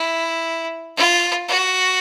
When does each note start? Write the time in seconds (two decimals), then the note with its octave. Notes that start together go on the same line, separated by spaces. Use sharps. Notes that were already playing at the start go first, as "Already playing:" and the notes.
Already playing: E4
0.97 F4
1.49 F#4